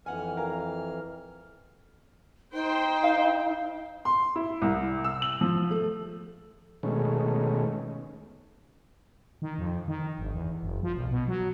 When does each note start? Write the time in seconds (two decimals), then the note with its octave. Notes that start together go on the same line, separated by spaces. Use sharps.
0.06 F2 E3 F#5 G#5 F6
0.37 A#4 F5 G#5
2.53 D#4 C5 G5
3.04 F5
4.05 C6
4.36 E4
4.62 C2
5.04 E6
5.22 F#7
5.41 F3
5.70 A3
6.83 B2 D#3 G#3 A3 C#4
9.42 D#3
9.58 F2
9.88 D#3
10.18 G1
10.34 E2
10.63 F#1
10.83 F3
10.96 B1
11.11 B2
11.28 F#3